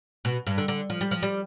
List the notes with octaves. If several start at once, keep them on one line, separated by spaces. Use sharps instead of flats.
B2
G2
D3
D3
F3
G3
F3
G3